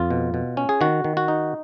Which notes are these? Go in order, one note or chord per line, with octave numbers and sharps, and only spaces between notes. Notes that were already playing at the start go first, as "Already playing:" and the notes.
Already playing: F2 F4
B2
B2
C#4
G#4
D#3 F#4
D#3
F#4
D#4